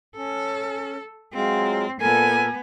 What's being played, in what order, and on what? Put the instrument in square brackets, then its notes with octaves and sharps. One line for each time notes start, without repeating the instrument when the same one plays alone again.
[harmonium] C#4 [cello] A4
[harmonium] F#3 G#3 F4 [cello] C4
[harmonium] A#2 A4 A#4 [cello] B3 [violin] G#5